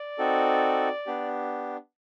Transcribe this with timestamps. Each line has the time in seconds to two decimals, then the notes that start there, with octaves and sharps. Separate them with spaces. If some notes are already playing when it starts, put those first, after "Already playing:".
Already playing: D5
0.18 C4 D#4 F#4 A4
1.06 B3 D4 G4